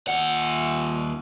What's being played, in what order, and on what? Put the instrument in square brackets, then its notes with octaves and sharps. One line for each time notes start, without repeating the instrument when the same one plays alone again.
[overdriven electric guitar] D#2 F#5